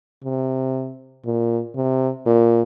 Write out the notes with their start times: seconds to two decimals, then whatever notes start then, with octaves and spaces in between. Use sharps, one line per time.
0.24 C3
1.25 A#2
1.76 C3
2.26 A#2